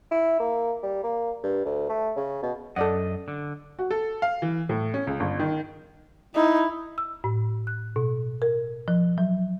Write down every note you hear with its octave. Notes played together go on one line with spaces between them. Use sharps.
E4
A#3
G3
A#3
G2
D2
A3
C#3
B2
F#2 A4 D5 D#5 F#5
D3
F#4
A4
F5
E3
A2
C#4
C#2
G1
D#3
D#4 E4
E6
A2
F#6
B2
A#4
F3
F#3